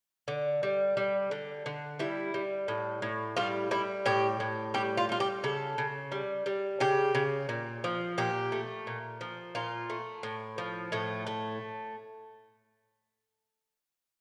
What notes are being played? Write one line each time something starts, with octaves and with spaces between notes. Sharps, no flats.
D3
G3
G3
D3
D3
G3 E4
G3
A2
A2
G3 F4
G3 E4
A2 G4
A2
G3 G4
F4
G3 F4
G4
C#3 A4
C#3
G3
G3
C#3 G4
C#3
A#2
F3
A#2 G4
A3
A#2
F3
A#2 F4
A3
A2
F3
A2 A3
A3